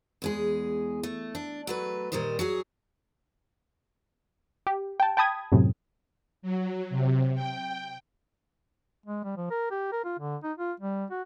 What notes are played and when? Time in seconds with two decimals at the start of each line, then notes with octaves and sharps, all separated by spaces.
0.22 E2 G#3 G#4
1.03 A3
1.35 D4
1.67 F#3 A3 B4
2.12 A#2 D#3 G3 C5 D#5
2.39 F#3 F#4 G#4
4.67 G4
5.00 G5 A5
5.17 G5 A5 B5 D#6 G#6
5.52 F#2 A2 C3
6.42 F#3
6.90 C3
7.35 G5
9.06 G#3
9.24 G3
9.37 F3
9.50 A#4
9.71 G4
9.92 A#4
10.04 F4
10.19 D3
10.44 D#4
10.58 F4
10.80 G3
11.10 F#4